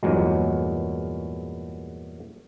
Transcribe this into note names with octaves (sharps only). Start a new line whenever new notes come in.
E2 G2 A#2 F#3 G#3